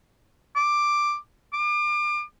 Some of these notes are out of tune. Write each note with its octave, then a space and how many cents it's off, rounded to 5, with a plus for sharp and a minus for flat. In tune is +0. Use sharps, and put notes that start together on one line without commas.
D6 +5
D6 +35